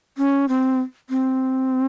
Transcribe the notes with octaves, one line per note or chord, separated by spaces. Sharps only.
C#4
C4
C4